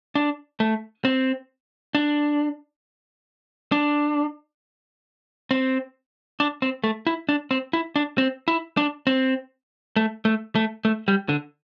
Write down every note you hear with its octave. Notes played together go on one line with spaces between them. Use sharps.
D4
A3
C4
D4
D4
C4
D4
C4
A3
E4
D4
C4
E4
D4
C4
E4
D4
C4
A3
A3
A3
A3
G3
D3